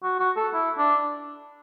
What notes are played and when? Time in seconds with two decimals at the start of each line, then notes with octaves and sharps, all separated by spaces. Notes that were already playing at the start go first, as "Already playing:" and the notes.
0.03 F#4
0.19 F#4
0.36 A4
0.53 E4
0.78 D4